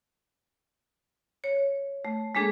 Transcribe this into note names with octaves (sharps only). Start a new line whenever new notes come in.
C#5
A3
G#3 A#3 D4 G#4 A4